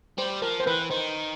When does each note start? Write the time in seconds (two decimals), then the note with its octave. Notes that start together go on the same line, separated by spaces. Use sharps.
0.18 G3 C5
0.42 F3 A#4
0.60 C5
0.67 E3 B4
0.90 D#3 C5